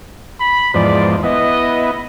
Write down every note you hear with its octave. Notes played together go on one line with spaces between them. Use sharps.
B5
E2 G#2 F3 D5
B3 E4 D#5